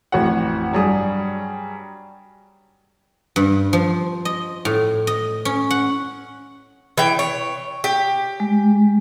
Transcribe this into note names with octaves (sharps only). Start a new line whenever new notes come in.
A1 F2 F#4 C#5 F#5
G2 F#3 G3 G#4 D#6
G2
F3
D#5
A2
D#5
C#4
F#5
E3 G5
C#5
G4
G#3